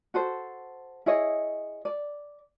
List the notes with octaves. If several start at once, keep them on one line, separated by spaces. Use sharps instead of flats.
F#4 A4 C5
E4 G#4 C#5 D#5
D5